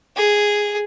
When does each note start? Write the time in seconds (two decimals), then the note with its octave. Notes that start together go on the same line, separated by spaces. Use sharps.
0.16 G#4